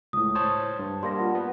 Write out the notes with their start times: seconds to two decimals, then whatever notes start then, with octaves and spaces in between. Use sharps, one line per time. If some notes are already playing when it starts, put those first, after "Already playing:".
0.13 C#2 A2 D#6
0.35 C5 C#5 A5
0.79 G2
1.03 G3 A#3 C6 A#6
1.16 F4 F#5 A5
1.35 B3